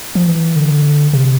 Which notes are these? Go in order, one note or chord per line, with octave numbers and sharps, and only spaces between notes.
F3
E3
D3
C3